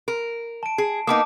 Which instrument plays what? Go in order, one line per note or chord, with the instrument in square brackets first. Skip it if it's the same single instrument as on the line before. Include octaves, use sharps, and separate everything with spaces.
[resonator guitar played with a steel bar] A#4
[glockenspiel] A5 D7
[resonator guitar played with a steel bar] G#4
[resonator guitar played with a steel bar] A#3 B3 D#4 [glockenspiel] A5 D6 D#6